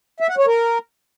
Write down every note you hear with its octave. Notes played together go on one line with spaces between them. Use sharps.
E5
F#5
C#5
A#4